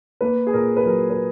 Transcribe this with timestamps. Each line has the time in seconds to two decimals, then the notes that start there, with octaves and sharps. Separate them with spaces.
0.21 A#3 B4
0.47 G#4
0.53 A#2 A#4
0.77 B4
0.86 F#3 A#4
1.10 B4